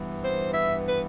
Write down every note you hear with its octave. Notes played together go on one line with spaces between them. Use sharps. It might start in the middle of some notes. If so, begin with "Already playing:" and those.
Already playing: G2 E3 B3
C5
E5
B4